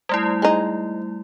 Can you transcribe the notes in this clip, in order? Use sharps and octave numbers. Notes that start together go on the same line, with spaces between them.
G3 A3 E4
G#3 D#4